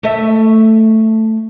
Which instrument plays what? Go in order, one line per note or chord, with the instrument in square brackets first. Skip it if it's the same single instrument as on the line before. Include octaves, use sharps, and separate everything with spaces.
[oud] A3 E5